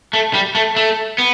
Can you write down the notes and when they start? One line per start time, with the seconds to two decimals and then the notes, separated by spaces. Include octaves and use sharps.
0.13 A3
0.34 G3
0.55 A3
0.76 A3
1.18 B3